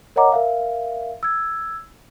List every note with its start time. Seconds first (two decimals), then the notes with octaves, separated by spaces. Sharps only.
0.16 A#4 C#5 D#5 F#5 A#5 D6
0.32 A#4 E5 F5
1.23 E6 G#6